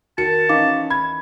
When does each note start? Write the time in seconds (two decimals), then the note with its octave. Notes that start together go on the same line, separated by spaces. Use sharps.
0.18 D#3 F#4 A#4 A5 C#7
0.49 E3 C#4 D#4 F5 D6
0.90 B5 G#6